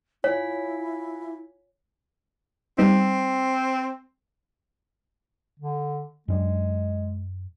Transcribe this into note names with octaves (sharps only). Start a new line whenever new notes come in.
E4 F4 C#5 G#5 B6
G3 B3 C4 D#4
D3
F#2 G#3 C#4 D4